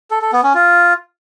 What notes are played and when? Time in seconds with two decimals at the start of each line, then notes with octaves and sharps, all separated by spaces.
0.11 A4
0.22 A4
0.33 B3
0.43 C#4
0.54 F4